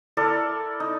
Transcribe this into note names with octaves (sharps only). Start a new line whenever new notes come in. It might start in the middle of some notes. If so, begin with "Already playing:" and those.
E4 A4 A#4 D5
D#4